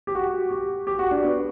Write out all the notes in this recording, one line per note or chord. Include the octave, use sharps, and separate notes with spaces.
G4
F#4
G4
G4
F#4
D4
B3